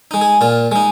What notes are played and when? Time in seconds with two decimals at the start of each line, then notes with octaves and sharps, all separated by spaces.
0.11 G#3 D#4
0.21 G#4
0.41 A#2 F4
0.72 G#3 D#4